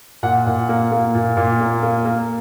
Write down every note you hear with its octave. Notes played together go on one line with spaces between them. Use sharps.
A#2 F#5
A#2
A#3
A#3
A#2
A#2
A#3
A#3
A#3